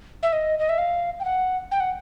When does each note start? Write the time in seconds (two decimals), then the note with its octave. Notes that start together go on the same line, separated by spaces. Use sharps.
0.23 E5
0.33 D#5
0.59 D#5
0.69 E5
0.78 F5
1.20 G5
1.25 F#5
1.71 G5
1.80 F#5